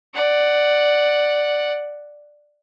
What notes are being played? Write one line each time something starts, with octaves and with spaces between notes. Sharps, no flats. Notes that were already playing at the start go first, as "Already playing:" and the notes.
D5 F#5